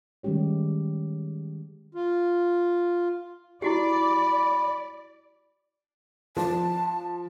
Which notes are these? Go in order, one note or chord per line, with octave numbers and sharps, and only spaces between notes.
D#3 G3 G#3 C#4 G4 C#5
F4
E4 F#4 G4 D5 B5
F3 A5